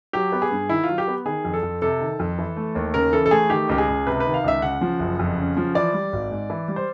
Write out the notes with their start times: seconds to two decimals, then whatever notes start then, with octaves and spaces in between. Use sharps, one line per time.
0.13 F#3 G4
0.32 B3
0.42 G#4
0.51 G2
0.69 D#3 E4
0.83 F#3 F4
0.98 G4
1.07 B3
1.25 D#3 G#4
1.45 F2
1.53 A4
1.63 F2
1.82 C3 A4
2.01 D#3
2.19 F2
2.38 E3
2.56 A3
2.75 D#2
2.94 C#3 A#4
3.13 E3 A4
3.26 A4
3.31 A3 G#4
3.50 D#3 G4
3.69 C#2 G4
3.78 G#4
3.88 C#2
4.06 C3 B4
4.20 B4
4.26 D#3
4.34 F5
4.44 C#2 E5
4.62 C#3 F#5
4.81 F3
4.99 F#1
5.19 F2
5.38 C#3
5.57 F3
5.75 E3 D5
5.94 G3
6.13 G#1
6.31 G#2
6.50 E3
6.68 G3
6.76 C5